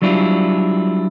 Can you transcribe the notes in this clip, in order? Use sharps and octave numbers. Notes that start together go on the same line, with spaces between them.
F#3 G3 D4 E4 F4